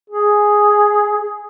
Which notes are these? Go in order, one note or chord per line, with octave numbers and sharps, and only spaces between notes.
G#4